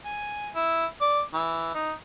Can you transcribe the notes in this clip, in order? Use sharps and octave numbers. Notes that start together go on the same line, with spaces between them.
G#5
E4
D5
E3
D#4